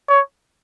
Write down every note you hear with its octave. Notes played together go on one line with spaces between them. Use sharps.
C#5